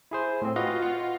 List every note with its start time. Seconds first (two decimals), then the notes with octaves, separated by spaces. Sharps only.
0.11 E4 G#4 C5
0.42 A2 C4
0.56 F4 F#4 B4 D#5
0.82 F4 F#5